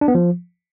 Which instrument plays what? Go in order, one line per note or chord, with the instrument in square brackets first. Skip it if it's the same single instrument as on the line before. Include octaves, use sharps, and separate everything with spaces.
[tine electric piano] D4
B3
F3